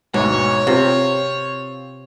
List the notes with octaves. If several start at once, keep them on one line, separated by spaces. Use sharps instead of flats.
D2 G#2 B2 C#5
C3 C4 F4